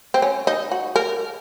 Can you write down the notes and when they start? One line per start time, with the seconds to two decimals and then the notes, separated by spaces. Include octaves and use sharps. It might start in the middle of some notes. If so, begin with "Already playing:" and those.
0.14 C4
0.22 C#4
0.47 D#4
0.72 F#4
0.96 A#4